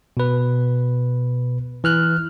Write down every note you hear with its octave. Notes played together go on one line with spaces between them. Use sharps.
B2 B4
E3 F6 F#6